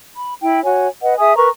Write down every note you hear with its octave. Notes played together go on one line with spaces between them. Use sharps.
B5
E4 G5
F#4 C#5 G#5
B4 D#5 F#5
G#4 E5 G#5 D#6
A#4 B4 A#5 C#6